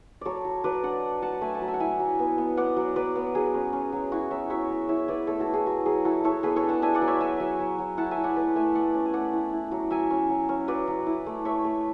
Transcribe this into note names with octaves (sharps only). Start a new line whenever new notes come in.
F#3 A4 C#5 D5
F#3
F#3 B4 D5
D4 D5 F#5
D4
F#3 F#5 A5
A3 E5 G#5
F#5 A5
F#3
E5 G#5
F#5
E4 E5 G#5
F#3
B3
B3
B3 D5 F#5
F#3
F#3 B4 D5
B3
F#3 G#4
C#4
C#4
F#3
E4 F#4
F#3 C#5 E5
F#3 C#5 E5
F#3
E4 C#5 E5
E4 B4 D5
A3 A4 C#5
F#4 A4
E4
G#4
F#3 F#4
F#3 G#4
E4 F#4 A4
E4 A4 C#5
B3 G#4 B4
A4 C#5
D4
F#5 A5
D4 E5 G#5
D5 F#5
F#3
C#5 E5
F#3 E5 G#5
F#3
F#3
F#3
E4 F#5 A5
E5 G#5
E4
D5 F#5
A3 B4 D5
A3 E5 G#5
A3 D5 F#5
C#4
G#5
A3 D5 F#5
E4
E4
F#3
F#3 E5 G#5
C#4
F#3
C#4
F#3 B4 D5
F#3
E4
A3
A3 C#5 E5
A3